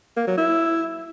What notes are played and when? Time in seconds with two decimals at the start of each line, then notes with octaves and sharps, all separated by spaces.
0.17 A#3
0.27 F#3
0.38 E4